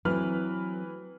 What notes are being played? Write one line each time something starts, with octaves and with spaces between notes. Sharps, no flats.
E3 F#3 A3 C4 B4 F6